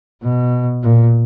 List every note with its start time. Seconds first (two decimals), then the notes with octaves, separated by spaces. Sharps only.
0.22 B2
0.83 A#2